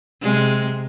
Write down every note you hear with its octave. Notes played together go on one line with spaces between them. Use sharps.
C3 G#3